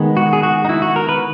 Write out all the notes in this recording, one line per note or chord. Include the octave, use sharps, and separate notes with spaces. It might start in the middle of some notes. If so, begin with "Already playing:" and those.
Already playing: D#3 G#3 B3
F#4
G#4
F#4
D#4
E4
F#4
A#4
B4